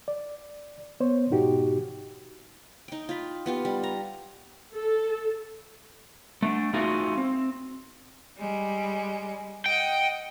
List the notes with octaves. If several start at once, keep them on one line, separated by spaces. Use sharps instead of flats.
D5
B3 C5 C#5
G#2 B2 D#4 F#4 G4
D#4 G5
F4 B5
B3 F4 G4
G3
A#5
A4
A3 D4
A3 D#4 F4 F#4 G#4
C4
G3 G#3
D#5 F#5 G5